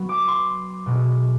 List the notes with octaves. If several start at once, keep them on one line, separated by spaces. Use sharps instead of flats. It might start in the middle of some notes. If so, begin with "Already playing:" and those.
Already playing: F#3 B3
D6
C6
B2 G#3 C#4